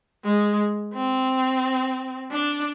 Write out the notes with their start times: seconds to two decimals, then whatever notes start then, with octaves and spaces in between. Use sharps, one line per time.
0.24 G#3
0.94 C4
2.32 D4